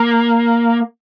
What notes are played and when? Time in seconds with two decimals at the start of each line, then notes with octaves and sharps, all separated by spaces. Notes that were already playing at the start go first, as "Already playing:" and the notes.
Already playing: A#3